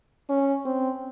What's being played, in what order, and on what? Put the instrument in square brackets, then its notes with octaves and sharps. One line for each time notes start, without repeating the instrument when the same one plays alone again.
[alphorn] C#4
C4